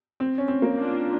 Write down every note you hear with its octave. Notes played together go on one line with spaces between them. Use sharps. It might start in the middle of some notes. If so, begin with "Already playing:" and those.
C4
C#4
C4
A#3
A#3 D4 F4